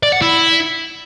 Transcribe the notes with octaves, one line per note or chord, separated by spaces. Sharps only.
D5
F#5
E4